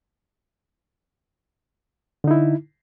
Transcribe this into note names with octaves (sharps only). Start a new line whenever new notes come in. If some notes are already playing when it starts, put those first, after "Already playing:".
D3 D#4 E4